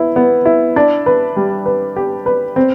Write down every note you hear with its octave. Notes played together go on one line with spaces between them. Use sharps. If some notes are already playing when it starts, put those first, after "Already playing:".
Already playing: B3 E4
B3
E4
D4
B4
G3
B4
G4
B4
C4